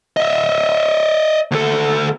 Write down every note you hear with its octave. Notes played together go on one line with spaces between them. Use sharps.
D#5 E5
D2 A4